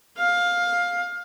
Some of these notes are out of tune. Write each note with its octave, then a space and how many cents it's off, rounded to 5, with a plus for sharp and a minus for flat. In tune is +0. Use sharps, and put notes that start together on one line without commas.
F5 +15